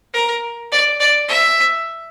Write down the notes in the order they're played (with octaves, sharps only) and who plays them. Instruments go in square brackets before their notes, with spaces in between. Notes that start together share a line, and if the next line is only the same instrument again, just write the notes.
[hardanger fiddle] A#4
D5
D5
E5